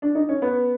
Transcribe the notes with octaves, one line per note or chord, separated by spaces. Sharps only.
D4
D#4
C#4
B3